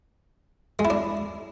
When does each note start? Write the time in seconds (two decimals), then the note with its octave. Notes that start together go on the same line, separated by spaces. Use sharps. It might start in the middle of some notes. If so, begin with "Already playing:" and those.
0.79 G#3
0.85 E4
0.90 D4